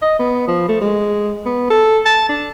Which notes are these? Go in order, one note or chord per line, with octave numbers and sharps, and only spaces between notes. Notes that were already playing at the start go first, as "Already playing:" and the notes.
D#5
B3
F3
A3
G#3
B3
A4
A5
D4